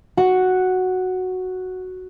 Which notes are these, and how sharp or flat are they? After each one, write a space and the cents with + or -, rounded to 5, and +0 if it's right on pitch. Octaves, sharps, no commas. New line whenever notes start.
F#4 +0 F#5 +0